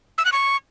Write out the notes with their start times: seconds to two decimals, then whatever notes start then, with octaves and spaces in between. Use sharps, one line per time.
0.18 E6
0.25 F#6
0.32 C#6